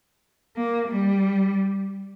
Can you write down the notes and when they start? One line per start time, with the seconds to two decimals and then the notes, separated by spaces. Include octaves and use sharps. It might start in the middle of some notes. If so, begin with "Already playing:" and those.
0.56 A#3
0.89 G3